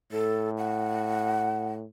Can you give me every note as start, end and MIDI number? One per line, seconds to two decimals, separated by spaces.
0.12 1.86 45
0.12 0.50 69
0.58 1.67 78